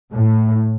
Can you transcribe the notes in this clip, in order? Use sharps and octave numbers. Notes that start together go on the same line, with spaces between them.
A2